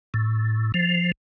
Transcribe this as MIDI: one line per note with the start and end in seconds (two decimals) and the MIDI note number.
0.14 0.72 45
0.74 1.12 53